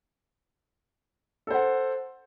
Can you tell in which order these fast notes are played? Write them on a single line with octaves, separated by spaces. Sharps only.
A4 C5 F#5